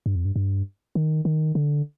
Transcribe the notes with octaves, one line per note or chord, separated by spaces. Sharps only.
G2
F2
G2
G2
D#3
D#3
D3